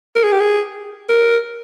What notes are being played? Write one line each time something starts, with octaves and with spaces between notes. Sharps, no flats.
A#4
G#4
G4
G#4
A#4